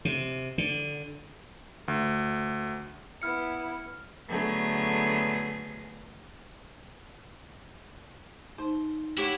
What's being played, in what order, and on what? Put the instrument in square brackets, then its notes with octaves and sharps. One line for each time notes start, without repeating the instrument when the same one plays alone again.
[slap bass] C3
D3
[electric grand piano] D2
[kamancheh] B3 E4 [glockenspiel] F6 C#7
[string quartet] D3 F#3 A3 B3 G#4
[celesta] D#4 [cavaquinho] C5
[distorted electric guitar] E4 [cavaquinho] G4 C#5 F#5